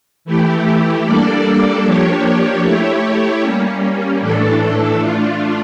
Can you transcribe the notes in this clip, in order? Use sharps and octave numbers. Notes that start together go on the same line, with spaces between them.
E3 A3 E4 G4
G3 A#3 D4 A4 D5
F3 A#3 D4 G4 C#5
A3 E4 G4 C#5
G3 A#3 C#4
A2 E3 A3 D4 A4
A3 D4 F4